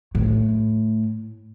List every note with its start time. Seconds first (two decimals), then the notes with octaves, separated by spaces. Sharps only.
0.15 A2